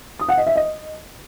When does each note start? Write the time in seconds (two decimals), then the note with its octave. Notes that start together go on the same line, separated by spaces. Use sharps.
0.19 D#6
0.29 F#5
0.38 D#5
0.47 E5
0.56 D#5